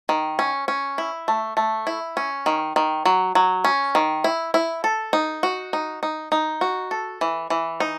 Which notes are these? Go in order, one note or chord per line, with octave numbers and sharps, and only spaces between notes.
D#3
C#4
C#4
E4
A3
A3
E4
C#4
D#3
D#3
F#3
F#3
C#4
D#3
E4
E4
A4
D#4
F#4
D#4
D#4
D#4
F#4
A4
E3
E3
D#4